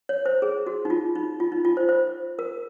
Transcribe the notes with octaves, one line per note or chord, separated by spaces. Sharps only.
C#5
C5
G#4
F#4
D#4
F4
D#4
F4
D#4
F4
C5
C5
A#4